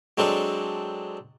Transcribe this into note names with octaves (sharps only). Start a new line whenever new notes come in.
F#3 G#3 C4 D4 A4